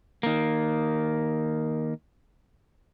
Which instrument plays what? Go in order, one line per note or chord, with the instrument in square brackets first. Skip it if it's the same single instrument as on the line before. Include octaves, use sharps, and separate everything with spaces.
[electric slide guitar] D#3 A#3